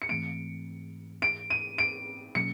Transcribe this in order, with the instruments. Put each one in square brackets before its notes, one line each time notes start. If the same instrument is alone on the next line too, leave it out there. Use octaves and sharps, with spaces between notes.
[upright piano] C#7
[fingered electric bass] G#2 E3 A3 C4 [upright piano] D7
[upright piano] D7
D#7
D7
[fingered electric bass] B2 F#3 A#3 C#4 [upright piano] C#7